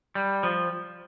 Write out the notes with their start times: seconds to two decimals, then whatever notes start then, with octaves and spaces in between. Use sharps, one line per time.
0.15 G3
0.43 F3